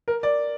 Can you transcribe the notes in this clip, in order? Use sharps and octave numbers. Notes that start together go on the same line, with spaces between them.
A#4
D5